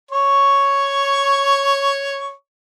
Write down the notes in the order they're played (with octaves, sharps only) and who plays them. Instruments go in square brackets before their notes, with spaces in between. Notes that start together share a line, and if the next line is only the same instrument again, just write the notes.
[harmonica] C#5 C#6